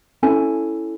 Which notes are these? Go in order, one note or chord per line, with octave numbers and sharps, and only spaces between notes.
C#4 E4 A4 G#5